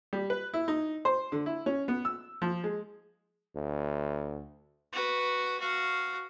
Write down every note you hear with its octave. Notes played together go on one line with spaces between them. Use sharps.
G3
B4
E4
D#4
C5
D3
E4
C#4
B3
E6
F3
G#3
D2
F#4 B4
F#4 F5